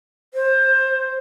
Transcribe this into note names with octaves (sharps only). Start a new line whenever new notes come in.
C5